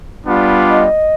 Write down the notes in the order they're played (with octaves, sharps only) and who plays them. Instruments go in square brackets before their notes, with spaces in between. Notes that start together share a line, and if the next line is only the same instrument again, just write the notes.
[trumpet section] G3 B3 D4 F4
[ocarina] D#5